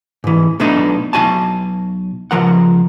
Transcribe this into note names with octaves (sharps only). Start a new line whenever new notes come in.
G#2 E3
B1 B2 A3 D4 D#4
B1 E3 F#4 G#5 A5
C#2 F3 A#4 F#5